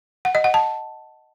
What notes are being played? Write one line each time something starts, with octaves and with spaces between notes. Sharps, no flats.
F#5
D#5
F#5
A5